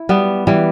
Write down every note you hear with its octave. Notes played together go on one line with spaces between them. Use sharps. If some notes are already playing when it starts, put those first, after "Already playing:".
Already playing: E4
G3 B3
E3 G3